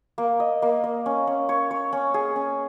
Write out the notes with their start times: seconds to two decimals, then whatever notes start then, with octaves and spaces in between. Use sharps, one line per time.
0.18 A#3
0.40 D#5
0.62 A#3
0.84 D#5
1.06 C#4
1.27 C#4
1.49 C#5
1.71 C#5
1.93 C#4
2.14 G#4
2.36 C#4